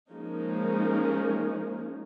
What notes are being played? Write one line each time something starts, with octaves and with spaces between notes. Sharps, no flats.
F3 G#3 A#3 C#4 D#4